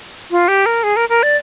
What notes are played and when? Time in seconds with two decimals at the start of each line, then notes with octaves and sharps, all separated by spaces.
0.31 F4
0.48 G4
0.66 A#4
0.83 G#4
0.96 A#4
1.09 A#4
1.23 D5